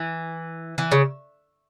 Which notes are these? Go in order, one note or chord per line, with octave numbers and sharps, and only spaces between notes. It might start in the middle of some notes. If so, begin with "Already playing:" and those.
Already playing: E3
E3
C#3